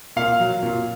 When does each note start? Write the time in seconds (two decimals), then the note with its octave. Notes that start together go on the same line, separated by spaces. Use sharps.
0.16 A#2 F5
0.40 F#3
0.63 A#2